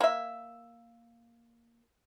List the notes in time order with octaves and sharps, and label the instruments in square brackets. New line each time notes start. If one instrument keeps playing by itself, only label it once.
[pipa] A#3 E5